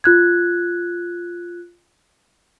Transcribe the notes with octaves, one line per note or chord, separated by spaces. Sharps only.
F4 F#6 G#6